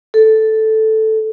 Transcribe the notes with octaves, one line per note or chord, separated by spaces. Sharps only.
A4